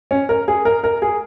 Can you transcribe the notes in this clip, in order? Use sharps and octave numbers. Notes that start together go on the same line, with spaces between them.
C#4
A#4
G#4
A#4
A#4
G#4